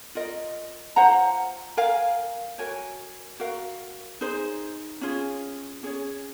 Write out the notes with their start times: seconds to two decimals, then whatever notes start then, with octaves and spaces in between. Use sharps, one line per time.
0.15 F4 A#4 D#5
0.96 F4 C5 F#5 A#5
1.77 A#4 F5 G#5
2.58 F#4 A#4 C#5 G#5
3.40 F#4 A#4 F5
4.21 D#4 G#4 C5
5.01 C#4 F4 G#4
5.83 C#4 G#4 C#5